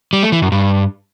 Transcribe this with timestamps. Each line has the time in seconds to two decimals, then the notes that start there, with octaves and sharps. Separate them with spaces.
0.13 G3
0.23 A3
0.32 E3
0.42 F#2
0.52 G2